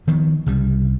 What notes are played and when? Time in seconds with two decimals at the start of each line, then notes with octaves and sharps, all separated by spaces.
0.07 D#3 F3 B3
0.46 C2 C#3 G3